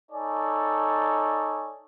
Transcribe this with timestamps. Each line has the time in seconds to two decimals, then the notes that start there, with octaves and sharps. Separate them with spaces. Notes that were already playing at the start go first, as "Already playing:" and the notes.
0.11 D#4 A4 C#5 D5 G#5